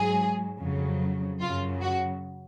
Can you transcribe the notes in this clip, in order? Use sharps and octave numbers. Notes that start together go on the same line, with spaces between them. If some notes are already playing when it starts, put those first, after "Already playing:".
Already playing: G#2 F#3 G#4
F2 C#3 F#3
F#2 C#3 F#3 F4
F#4